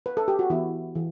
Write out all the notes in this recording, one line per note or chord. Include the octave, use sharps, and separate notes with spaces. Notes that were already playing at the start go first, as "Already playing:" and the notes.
B4
A4
G4
F#4
E3 B3 E4
E3